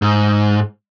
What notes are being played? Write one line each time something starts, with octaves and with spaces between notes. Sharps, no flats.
G#2